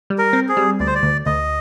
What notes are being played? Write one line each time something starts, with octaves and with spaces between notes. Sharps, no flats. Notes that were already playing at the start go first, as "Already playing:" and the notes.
G3
A#4
C4
G#4
G3
D2 D5
C5
D5
D2
D2 D#5